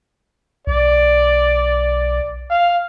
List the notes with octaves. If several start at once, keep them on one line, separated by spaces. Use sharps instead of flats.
B1 D5
F5